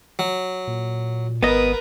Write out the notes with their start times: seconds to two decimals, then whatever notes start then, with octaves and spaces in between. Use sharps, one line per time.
0.19 F#3
0.67 A#2
1.43 G#1 B3 A#4 B4 D#5